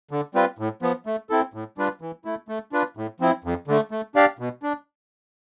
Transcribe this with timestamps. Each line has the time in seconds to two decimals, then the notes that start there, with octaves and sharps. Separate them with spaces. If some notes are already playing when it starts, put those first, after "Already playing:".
0.11 D3
0.34 G3 C4 F4 B4
0.58 A2
0.82 F3 B3
1.06 A3
1.30 C4 E4 A4
1.54 A2
1.78 G3 D4 F4 B4
2.01 E3
2.25 A3 E4
2.49 A3
2.72 D4 F4 B4
2.97 A2
3.20 F3 C4 E4
3.44 F2
3.67 D3 A3
3.91 A3
4.15 D4 G4 D5 F5
4.39 B2
4.63 D4